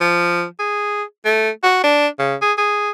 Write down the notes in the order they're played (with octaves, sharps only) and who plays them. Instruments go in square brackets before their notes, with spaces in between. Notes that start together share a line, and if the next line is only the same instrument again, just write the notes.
[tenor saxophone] F3
G#4
A3
F#4
D4
C#3
G#4
G#4